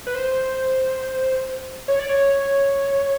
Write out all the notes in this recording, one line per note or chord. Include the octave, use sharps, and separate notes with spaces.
B4
C5
C#5
D5
C#5